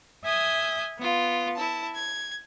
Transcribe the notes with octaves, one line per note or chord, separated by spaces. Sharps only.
E5 G#5 D#6 G6
B3 F4
E4 A5
G#6